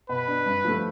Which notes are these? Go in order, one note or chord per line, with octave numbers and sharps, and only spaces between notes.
B2 B4
B3 D4
G2
F3 A3